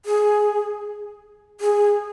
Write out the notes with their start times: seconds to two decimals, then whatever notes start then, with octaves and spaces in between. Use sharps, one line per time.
0.05 G#4
1.61 G#4